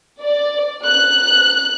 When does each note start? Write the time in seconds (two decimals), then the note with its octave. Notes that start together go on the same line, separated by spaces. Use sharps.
0.21 D5
0.84 F#6